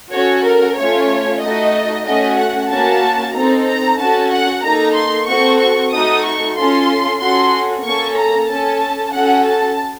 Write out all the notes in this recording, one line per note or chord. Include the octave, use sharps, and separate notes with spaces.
C#4 F#4 A4 C#5
A#4
A3 C#4 F4 C#5
A3 D#4 F#4 A4 D#5
A3 C#4 F#4 D#5
F#5
A#3 C#4 F#4 A5
C4 D#4 A4 A#5
A#5
C#4 F#4 A4 A5
F#5
A#3 D#4 A4 A#5
C6
C4 F#4 A4 C#6
C#6
A3 D#4 F#4 A4 D#6
C#6
C#4 F4 A4 C6
C#4 F#4 A4 C6
A#3 C#4 A4 C#6
A#5
C#4 A4 A5
C#4 F#4 A4 F#5
A5